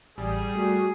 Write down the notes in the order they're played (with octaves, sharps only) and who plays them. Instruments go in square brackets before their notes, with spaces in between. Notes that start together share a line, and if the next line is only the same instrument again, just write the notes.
[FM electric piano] A1 [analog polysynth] G3 [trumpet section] G#4
[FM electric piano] A3 [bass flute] F#4